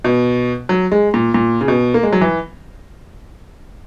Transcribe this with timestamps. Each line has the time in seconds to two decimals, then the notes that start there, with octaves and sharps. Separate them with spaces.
0.04 B2
0.69 F#3
0.92 G#3
1.14 A#2
1.34 A#2
1.61 C#3
1.68 B2
1.94 A#3
2.03 G#3
2.12 F#3
2.21 E3